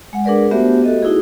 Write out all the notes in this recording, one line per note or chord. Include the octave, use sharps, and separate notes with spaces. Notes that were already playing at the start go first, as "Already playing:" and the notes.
G#3 F#5
D4 G#4 A#4 B4 D5
A3 B3 F#4 G4 C5 E5
F#4 A4 D#5
D#4 E4 F#4 G#4